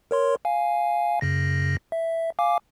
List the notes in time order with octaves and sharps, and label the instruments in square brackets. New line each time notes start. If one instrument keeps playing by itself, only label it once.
[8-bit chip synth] A#4 C#5 C6
F5 G#5
F#2 C#3 A#6
E5
F5 G#5 D6